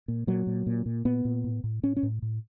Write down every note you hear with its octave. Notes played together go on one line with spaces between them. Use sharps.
A#2
A#2 F#3
A#2
A#2
A#2
A#2 B3
A#2
A2
A2
A2 C#4
C#4
A2
A2